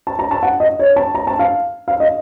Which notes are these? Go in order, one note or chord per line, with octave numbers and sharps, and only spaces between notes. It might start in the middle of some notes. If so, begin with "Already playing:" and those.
A5
A#5
A5
F#5
D#5
C#5
A5
A#5
A5
F5
F5
D#5